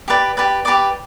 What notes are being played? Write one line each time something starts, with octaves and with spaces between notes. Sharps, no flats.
G4 B4 D5 D6
G4 B4 D5
G4 B4 D5 D6